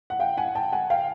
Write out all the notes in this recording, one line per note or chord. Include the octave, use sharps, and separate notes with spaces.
F#5
F5 G5
F#5 G#5
G5 A5
F#5 G#5
F5 G5